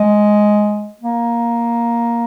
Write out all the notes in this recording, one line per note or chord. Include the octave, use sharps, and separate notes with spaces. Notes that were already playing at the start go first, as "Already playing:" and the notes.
Already playing: G#3
A#3